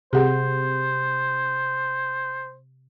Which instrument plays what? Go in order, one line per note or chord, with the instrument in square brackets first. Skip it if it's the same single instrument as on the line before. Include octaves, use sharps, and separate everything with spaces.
[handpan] C3 [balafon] G4 G#4 F#5 [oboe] C5